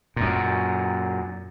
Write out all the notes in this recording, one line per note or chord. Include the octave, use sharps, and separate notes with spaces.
F#2 A#2